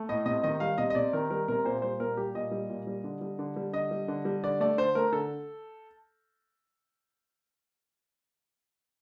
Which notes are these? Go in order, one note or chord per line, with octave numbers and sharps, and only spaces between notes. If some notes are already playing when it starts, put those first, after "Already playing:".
Already playing: A3
A2 D#5
C3 D#5
D#3 D#5
G3 F5
C3 D#5
D#5
C3 D5
D#3 A#4
G3 A#4
C3 A#4
A#2 C5
G3 C5
A#2 A#4
G3 G4
A#2 D#5
G3
A#2
G3
D3
G3
D3
G3
D3 D#5
G3
D3
G3
D3 D5
A3 D5
D3 C5
A3 A#4
D3 A4